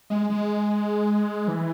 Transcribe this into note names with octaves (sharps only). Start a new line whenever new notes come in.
G#3
G#3
E3